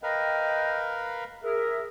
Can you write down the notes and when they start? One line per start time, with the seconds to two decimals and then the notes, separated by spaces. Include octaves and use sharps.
0.03 A#4 B4 D#5 F5 G5
1.43 G#4 A#4 E5